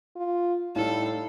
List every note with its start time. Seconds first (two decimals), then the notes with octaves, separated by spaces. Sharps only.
0.16 F4
0.76 A2 G3 D#4 E4 A4 F5